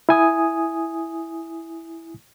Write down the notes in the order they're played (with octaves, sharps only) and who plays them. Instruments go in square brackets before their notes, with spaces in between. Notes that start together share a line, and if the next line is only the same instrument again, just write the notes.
[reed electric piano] E4 G#5 D#6